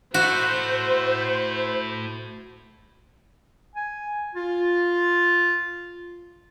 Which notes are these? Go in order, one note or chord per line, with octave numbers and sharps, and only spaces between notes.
A3 E4 F#4 C5
G#5
F4